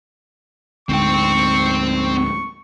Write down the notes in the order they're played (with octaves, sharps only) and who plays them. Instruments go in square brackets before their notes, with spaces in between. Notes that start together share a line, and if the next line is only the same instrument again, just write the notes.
[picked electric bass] D2 G#2 [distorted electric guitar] C4 G5 [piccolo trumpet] C#6
[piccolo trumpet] C#6